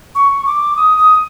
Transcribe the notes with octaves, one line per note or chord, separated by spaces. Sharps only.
C#6
D6
D#6
D#6